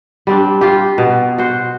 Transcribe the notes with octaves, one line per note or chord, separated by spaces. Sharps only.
G3 C4 D4
F4 G4
B2
F#4 C5